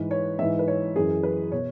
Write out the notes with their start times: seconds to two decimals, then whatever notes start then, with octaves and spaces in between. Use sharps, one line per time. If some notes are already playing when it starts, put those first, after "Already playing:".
Already playing: G#2 E3 B4
0.11 C#5
0.39 G#2 E3 E5
0.59 B4
0.68 C#5
0.96 F#2 E3 G#4
1.23 B4
1.52 B2 C#5